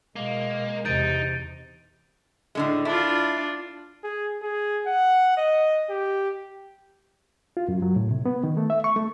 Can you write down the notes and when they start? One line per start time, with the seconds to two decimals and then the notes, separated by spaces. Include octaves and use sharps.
0.16 B2 G#3 A#3
0.85 E2 C3 D#4 G6 A6 D7
2.55 A2 D3 G#3
2.85 D4 E4 F4
4.04 G#4
4.43 G#4
4.86 F#5
5.37 D#5
5.90 G4
7.57 F4
7.69 F#2
7.82 F#3
7.96 A2
8.11 C3
8.26 B3
8.44 D#3
8.57 A3
8.70 E5
8.84 C#6
8.96 A3